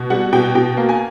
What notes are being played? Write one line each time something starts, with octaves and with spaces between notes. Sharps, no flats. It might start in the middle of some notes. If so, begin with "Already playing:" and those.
Already playing: B2
G3 F#5
B2 G5
B2 G5
A#3
G#5